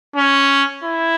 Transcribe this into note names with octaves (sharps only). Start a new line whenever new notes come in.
C#4
E4